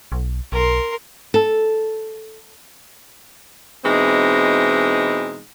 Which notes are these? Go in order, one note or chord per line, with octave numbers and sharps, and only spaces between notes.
B1
B1 A#4 C6
A4
B2 E3 G#3 C4 D#4